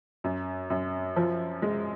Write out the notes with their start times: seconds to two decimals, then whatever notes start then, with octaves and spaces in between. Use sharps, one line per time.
0.24 F#2
0.70 F#2
1.16 F3
1.62 G#3